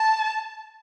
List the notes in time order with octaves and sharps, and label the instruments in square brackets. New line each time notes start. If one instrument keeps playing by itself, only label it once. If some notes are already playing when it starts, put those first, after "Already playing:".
Already playing: [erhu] A5